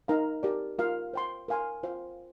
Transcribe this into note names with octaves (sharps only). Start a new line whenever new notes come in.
D#4 A#4 F5 A#5
G4 A#4 D5
F4 A#4 F5
C5 G5 C6
A#4 F5 G#5 C6
F4 C5 F5